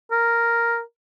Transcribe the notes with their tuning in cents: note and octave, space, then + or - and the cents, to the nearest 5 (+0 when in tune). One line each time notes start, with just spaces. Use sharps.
A#4 +0